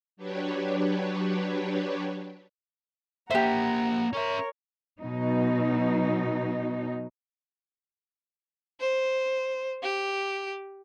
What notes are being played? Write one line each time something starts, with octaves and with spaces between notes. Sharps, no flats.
F#3 D4 G4 B4 C#5
A#3 G4 C5 E5 F#5 A#5
C#4 A#4 C#5 E5
B2 F#3 D#4
C5
G4